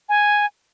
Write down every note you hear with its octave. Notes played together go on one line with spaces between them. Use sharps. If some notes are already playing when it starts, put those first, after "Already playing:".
G#5